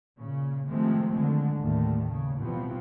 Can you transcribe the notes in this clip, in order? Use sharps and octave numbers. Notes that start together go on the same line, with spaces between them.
A#2 C#3
C3 D#3 F3 G#3 A3 C4
D3 D#3 G#3
D#2 A2 D3 D#3 G3 A3
C#3
B2 E3 F3 G3 B3 C4